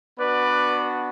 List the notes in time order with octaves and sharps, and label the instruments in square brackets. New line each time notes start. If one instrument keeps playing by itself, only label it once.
[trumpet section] B3 D4 F#4 B4 D5